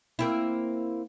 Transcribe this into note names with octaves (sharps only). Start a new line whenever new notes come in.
A#3 C4 E4